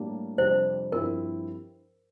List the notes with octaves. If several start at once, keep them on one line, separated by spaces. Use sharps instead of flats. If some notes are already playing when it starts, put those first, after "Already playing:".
Already playing: A2 G3 A#3 D4
F2 C3 G3 D4 C5
G2 F3 C4 E4 A#4